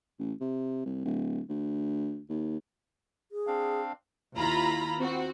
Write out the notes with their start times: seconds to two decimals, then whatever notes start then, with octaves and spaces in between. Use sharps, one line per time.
0.19 A1
0.41 C3
0.86 C2
1.05 D1
1.49 D2
2.29 D#2
3.32 G#4
3.47 C4 D4 F5
4.38 D#2 E4 F4 A#5 B5
5.00 C4 F#4